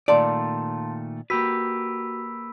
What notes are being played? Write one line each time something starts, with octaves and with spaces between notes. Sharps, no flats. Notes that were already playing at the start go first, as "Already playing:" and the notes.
A#2 D#3 A3 D5 F5 A5 C6
A#3 F#4 G4 B4 B5 E6 B6